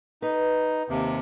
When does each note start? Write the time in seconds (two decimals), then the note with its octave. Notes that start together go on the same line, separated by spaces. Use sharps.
0.22 D#4 B4
0.89 D#2 C3